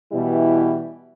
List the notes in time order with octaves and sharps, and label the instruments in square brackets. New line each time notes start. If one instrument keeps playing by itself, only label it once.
[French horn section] B2 E3 G3 E4